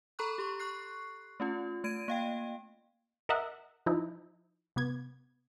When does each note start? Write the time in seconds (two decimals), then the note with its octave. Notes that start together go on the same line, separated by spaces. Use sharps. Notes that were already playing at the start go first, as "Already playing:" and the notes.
0.19 A4 A#5 B5 C#6 F#6
0.38 G4 C6 C#6
0.59 C#6 F#6 C7
1.40 A3 C#4 F4
1.84 A3 G#6 D7 D#7
2.08 A#3 F5 G5
3.29 A#4 D#5 E5 F#5
3.86 F3 D#4 E4
4.76 C3 B3 G#6